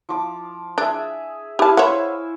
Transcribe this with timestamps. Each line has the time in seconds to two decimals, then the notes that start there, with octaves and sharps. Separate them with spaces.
0.09 F3 D6
0.78 D4 G#4 E5
1.59 E4 G4 B4 F5 A5
1.77 C5 C#5 E5 F#5 C#6